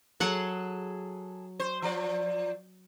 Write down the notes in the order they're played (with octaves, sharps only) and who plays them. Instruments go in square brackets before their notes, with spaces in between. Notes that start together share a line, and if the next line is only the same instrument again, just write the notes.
[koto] F#3 F#5 [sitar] G#4 A4
[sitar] C5
F3 D5